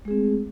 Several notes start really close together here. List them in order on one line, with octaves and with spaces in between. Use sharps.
G#3 G#4 C4 A3